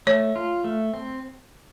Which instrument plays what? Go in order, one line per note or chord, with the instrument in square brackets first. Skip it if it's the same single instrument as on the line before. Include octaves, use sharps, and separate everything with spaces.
[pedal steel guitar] A3 [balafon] C#5
[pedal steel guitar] F4
A3
C4